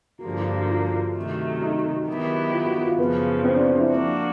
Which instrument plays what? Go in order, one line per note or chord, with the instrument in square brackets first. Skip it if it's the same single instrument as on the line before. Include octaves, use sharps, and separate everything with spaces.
[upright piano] F#4
[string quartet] G2 D3 F3 A#3 [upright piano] G4
[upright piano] F4
F#4
F4
F#4
F4
[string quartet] C3 D#3 F#3 A3
[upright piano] D#4
[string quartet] D#3 F#3 B3 E4 G4
[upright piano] F4
F#4
F#4
F4
[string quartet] F#2 C#3 F3 [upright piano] B3
[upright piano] C4
D4
D4
E4
[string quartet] F3 A#3 D4 F#4